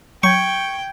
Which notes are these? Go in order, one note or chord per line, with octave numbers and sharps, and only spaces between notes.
F#3 G5 C#6 G6 G#6